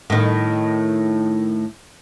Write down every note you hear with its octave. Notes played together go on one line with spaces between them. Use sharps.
A2 D#3